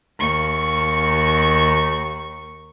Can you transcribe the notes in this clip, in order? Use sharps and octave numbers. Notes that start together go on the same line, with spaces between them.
D#2 C#6